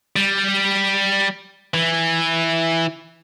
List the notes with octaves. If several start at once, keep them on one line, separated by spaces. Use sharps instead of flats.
G3
E3